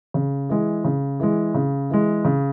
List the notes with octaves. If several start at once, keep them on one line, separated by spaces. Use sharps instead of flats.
C#3
E3 G#3
C#3
E3 G#3
C#3
E3 G#3
C#3